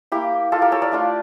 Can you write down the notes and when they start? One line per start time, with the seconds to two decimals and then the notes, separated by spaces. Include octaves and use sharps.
0.12 A#3 E4 G4
0.52 F4 A4
0.62 G4 A#4
0.72 A4 C#5
0.82 A#4 D5
0.92 A3 D4 F4